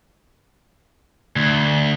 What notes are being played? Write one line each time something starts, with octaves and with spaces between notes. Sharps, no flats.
D2